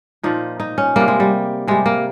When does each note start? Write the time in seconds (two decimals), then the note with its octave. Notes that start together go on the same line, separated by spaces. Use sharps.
0.23 A#2 F3 D#4
0.60 D#4
0.78 C#4
0.96 C3 G3 A#3
1.08 G#3
1.20 G3
1.68 C3 G3 G#3
1.86 A#3